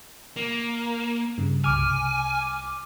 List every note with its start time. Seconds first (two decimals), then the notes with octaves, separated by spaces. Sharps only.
0.36 A#3
1.38 G2 C#3
1.64 C2 G#5 D6 F6